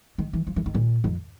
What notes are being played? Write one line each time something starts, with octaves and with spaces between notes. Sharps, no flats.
D#3
E3
F3
E3
D#3
A#2
F2